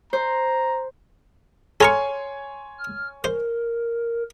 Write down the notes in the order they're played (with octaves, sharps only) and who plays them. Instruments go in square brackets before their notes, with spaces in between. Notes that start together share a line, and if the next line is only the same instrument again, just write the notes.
[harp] C5 [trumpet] A#5
[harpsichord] A4 A#4 C#6 [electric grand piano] C#5 G#5 C6
[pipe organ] F6
[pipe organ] A#4 [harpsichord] C5